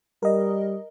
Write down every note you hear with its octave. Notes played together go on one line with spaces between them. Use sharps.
G3 A#4 D#5